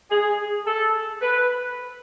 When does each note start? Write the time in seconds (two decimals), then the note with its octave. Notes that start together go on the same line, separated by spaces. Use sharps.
0.10 G#4
0.66 A4
1.22 B4